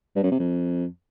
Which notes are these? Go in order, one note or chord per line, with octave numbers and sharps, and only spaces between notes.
G2
F#2
C3
F2